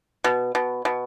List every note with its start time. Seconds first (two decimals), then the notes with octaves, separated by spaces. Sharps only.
0.24 B2
0.55 B2
0.85 B2